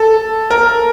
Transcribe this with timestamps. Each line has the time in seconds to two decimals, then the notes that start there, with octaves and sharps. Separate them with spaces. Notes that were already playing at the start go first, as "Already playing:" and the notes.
Already playing: A4
0.50 A#4